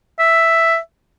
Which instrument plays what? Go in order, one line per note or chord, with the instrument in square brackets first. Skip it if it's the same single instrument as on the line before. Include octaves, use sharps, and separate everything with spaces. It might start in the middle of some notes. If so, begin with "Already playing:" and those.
[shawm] E5